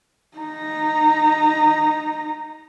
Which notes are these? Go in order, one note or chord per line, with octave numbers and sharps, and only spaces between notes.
D#4 A#5